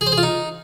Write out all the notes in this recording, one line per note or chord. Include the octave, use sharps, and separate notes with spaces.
G#4
C5
G#4
F4
D#4